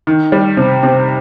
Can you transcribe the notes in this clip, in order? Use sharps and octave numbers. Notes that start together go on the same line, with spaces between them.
D#3
G3
C3
C3